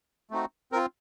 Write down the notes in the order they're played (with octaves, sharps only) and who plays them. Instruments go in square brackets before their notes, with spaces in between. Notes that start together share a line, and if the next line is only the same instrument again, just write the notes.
[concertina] A3 C4 D#4 F#4
C4 A#4
F4